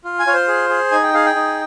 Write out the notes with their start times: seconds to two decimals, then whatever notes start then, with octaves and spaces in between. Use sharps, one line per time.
0.05 F4
0.19 G#5
0.27 F4 C#5
0.34 C5
0.48 G#4
0.69 G#4
0.91 D#4 G#5
1.03 G5
1.14 G#4 F5
1.25 G5
1.35 D#4